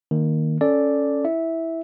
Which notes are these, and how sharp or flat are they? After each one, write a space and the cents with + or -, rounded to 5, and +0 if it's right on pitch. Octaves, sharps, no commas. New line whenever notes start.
D#3 +0 A#3 +0
C#4 +0 A4 +0 D5 +0
E4 -5 E5 -10